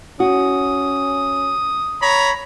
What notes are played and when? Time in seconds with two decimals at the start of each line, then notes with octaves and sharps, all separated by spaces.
0.20 C#4 F#4 D#6
2.02 C#5 A#5 B5